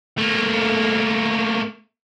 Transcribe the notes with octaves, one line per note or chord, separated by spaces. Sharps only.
A3 A#3